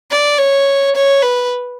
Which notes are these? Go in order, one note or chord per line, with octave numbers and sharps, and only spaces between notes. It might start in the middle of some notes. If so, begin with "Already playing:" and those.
D5
C#5
C#5
B4